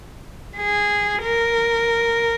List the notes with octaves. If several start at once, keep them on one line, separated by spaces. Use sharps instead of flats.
G#4
A#4